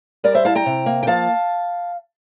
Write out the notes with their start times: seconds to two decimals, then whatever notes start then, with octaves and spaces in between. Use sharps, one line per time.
0.24 G3 A#4 D5
0.35 C5 E5
0.45 E4 F5 A5
0.55 G5 A#5
0.66 C3
0.86 A#3
1.03 G5
1.07 F3 F5 A5